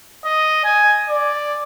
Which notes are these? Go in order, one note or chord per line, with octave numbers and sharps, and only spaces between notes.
D#5
G#5
D5